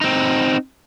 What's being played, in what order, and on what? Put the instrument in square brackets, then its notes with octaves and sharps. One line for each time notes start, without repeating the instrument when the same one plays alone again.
[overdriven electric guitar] C4 D#4